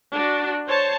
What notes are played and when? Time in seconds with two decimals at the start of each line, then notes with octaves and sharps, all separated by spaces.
0.13 D4 F#4
0.66 C5 C#5 A5